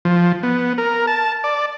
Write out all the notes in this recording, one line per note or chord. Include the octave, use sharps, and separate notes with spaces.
F3
B3
A#4
A5
D5